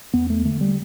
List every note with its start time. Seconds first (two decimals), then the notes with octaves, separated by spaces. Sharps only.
0.14 E2 B3
0.30 A3
0.45 D3 A3
0.61 G3